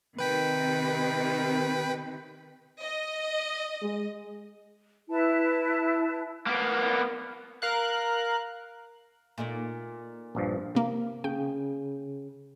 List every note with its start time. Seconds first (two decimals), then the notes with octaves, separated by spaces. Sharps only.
0.19 C3 D#3 B4 G5 B6
2.82 D#5
3.82 G#3
5.09 E4 B4 A5
6.47 A#3 B3
7.62 A#4 F5 F#6
9.38 A#2 A3 D#4
10.35 A#1 G2 F3
10.75 C3 A#3
11.24 C#3 G5